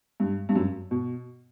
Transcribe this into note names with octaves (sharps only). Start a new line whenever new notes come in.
G2
G2
F#2
B2